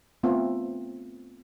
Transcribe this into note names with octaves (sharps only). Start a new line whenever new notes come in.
A3 B3 C4 F4